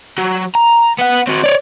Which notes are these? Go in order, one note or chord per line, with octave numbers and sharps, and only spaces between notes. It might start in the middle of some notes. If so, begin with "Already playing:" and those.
F#3
A#5
B3 F#5
C4 F#4
C#5 D5